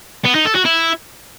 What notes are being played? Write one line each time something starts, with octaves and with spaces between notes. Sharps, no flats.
B3
D#4
A4
F#4
E4